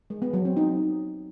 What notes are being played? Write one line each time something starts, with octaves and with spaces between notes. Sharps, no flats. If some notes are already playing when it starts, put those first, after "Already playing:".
G#3
B3
F#3
C4
D#4